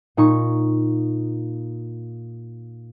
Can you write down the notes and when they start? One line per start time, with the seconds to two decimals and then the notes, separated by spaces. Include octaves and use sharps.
0.17 A#2 D#4 C#6